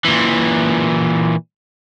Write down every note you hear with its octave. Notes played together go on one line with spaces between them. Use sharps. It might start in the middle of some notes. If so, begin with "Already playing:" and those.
A#2 E3